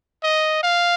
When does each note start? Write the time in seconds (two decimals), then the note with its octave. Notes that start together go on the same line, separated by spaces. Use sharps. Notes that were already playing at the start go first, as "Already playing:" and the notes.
0.23 D#5
0.63 F5